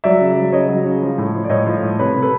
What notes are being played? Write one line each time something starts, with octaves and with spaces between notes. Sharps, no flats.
F#3 D5 E5
C#3
F#3
C#3 C#5 D#5
F#3
C#3
F3
A2
F3
D5
A2 C#5 D#5
F3
A2
C3 B4 C#5
C3
A4 B4